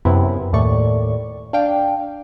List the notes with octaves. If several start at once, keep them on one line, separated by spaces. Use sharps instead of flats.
F#2 C3 B3 C4 E4
D#2 A2 A3 D5 C#6
D4 F5 G5